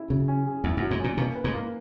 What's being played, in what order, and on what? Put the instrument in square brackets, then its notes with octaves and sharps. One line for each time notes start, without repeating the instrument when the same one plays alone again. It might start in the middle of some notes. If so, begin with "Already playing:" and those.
Already playing: [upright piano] C#4 E4 G#4
[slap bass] C#3 [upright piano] F#3
[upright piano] C#4
G#4
[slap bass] E2 [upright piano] E4
[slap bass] F#2
[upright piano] F#3
[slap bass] G#2
[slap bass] A#2 [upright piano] C#4
[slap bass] B2 [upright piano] A#3
[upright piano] B4
[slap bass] G#2
[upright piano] A#3